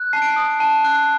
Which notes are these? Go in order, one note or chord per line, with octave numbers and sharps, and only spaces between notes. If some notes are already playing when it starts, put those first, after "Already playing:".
Already playing: F#6
A5 C7
D7
C7
D#6
A5
F#6